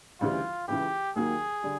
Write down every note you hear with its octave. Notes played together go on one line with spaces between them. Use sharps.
D2 C#3 E3 G3 F4
C#2 C#3 E3 G4
D#2 D#3 F#3 A#3 G#4
D3 G3